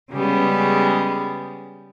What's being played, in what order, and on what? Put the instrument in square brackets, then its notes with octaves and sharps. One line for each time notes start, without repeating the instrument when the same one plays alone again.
[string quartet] C#3 G3 G#3 B3